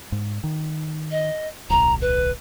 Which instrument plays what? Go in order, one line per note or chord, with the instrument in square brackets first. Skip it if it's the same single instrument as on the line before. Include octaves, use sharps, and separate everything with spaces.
[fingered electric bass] G#2
D#3
[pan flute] D#5
[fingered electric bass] D1 B1 [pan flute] A#5
[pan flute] B4